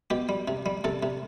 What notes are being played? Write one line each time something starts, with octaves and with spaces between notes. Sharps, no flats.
B2 G4
G3
C3
G3
C3 A4
C3